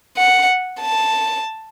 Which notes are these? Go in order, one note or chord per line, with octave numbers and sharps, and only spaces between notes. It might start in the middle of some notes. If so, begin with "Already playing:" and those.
F#5
A5